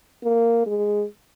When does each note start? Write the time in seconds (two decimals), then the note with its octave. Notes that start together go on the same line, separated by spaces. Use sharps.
0.24 A#3
0.67 G#3